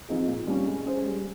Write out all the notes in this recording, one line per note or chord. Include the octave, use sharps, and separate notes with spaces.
F3 C4 D#4 G#4
A#2
G3 C#4
G#3
C#4 G#4 C5
G3